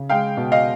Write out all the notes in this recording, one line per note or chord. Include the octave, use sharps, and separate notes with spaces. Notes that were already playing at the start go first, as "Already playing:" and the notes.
Already playing: C#3
G#3 F5 G5
B2
D#5 F5